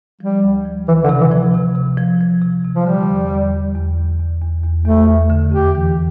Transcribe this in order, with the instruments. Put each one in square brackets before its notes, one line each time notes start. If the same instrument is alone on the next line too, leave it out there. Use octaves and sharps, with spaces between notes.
[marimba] F3 [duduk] G3
[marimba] D2
F3
[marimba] D2 [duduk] E3
[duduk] D3
[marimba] C3
[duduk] E3
[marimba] F3
C3
C3
F3
F3
C3
C3
[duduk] F3
[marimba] D3 [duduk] G3
[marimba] E2
E2
E2
E2
E2
E2
E2
E2
[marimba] E2 [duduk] A3
[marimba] E2
D3
[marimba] F2 [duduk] G4
[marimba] E3